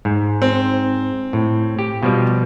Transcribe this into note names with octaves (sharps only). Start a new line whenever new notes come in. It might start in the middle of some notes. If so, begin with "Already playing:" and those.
G#2
C4
A2
G4
B2 F3 G3